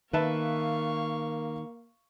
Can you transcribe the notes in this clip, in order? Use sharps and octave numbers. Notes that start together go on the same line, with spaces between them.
D#3 A#3 B4 E5 F5 A5 C#6